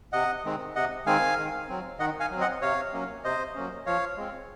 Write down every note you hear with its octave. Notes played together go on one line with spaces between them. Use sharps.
C3 D#5 F#5
D#3 G#3 C4
C3 D#5 F#5
D#3 G#3 C4 F5 G#5
D#3
F#3 C4
D#3 D#5 F#5
F5 G#5
F#3 C4
D#5 F#5
C3 C#5 F5
F#3 A#3 C#4
C3 C5 D#5
F#3 A#3 C#4
F3 C#5 F5
G#3 C4